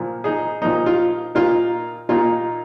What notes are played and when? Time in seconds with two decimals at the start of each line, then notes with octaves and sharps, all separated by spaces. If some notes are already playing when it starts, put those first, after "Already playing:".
Already playing: A#2 F3 A#3
0.24 D#4 G#4
0.62 A#2 F3 A#3 D#4
0.86 F4
1.35 A#2 A#3 D#4 F4 A#4
2.09 A#2 A#3 D#4 F4